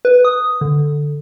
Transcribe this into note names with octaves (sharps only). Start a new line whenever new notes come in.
B4
D#6
D3